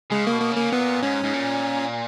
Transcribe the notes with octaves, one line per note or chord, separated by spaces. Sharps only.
C#3 G#3
A#3
B2
A#3
C#3
A#3
A#2 B3
G#2 C#4
G#2
A#2